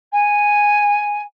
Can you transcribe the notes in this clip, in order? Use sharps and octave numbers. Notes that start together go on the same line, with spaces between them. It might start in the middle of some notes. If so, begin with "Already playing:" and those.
G#5